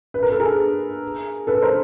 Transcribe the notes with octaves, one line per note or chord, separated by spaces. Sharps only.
B4
A#4
A4
G#4 A#4
A4 B4
A#4 C5